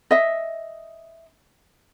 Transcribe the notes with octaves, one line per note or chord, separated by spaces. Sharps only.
D#5 E5